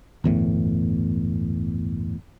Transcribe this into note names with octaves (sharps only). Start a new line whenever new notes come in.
G1 E2 A2